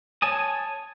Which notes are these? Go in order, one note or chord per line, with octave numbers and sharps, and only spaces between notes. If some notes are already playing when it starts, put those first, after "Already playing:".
C#5 G#5 A5 D#6